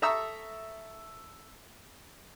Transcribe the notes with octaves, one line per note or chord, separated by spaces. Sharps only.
A4 E5 A#5 C#6 D#6 E6